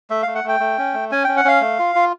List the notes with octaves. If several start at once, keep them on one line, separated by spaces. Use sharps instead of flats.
A3 E5
A3 F5
F#5
A3 G5
A3
C#4
A3
C#4 G#5
C#4 G5
F#5
C#4 F5
A3
F4
F4